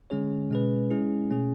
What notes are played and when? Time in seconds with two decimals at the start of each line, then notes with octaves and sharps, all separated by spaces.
0.10 D3 G#3 C#4 G#4 C#5
0.50 B2 G#3 C#4 G#4 B4
0.90 G#3 C#4 E4 G#4
1.30 B2 A3 C#4 G#4